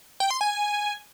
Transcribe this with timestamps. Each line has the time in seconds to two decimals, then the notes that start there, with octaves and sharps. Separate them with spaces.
0.20 G5
0.30 C6
0.41 G#5